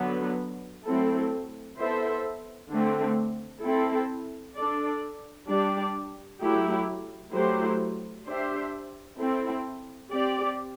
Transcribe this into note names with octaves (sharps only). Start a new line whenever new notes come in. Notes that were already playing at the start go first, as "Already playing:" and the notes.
Already playing: D3 F#3 B3
F#3 A3 C4 E4 A4
B3 E4 A4 C5 E5
D3 A3 C4
C4 E4 A4
D4 A4 D5
G3 D4 G4 D5
F#3 A3 E4 G4
F#3 A3 E4 G4 C5
D4 G4 C5 E5
C4 E4 A4
C4 G4 D5